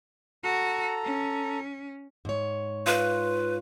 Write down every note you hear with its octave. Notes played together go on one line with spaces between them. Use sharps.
F#4 A4 A#5
C#4
G#2 C#5
F4 B4